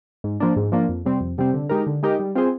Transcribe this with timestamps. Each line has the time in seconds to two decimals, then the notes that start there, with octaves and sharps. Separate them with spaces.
0.24 G#2
0.40 F3 A#3 D4
0.56 G#2
0.72 F3 A#3 D4
0.89 F2
1.06 C3 G3 C4
1.21 F2
1.38 C3 G3 C4
1.54 D3
1.70 G#3 D#4 G4 A#4
1.87 D3
2.03 G#3 D#4 G4 A#4
2.19 G3
2.35 C4 F4 G#4 C5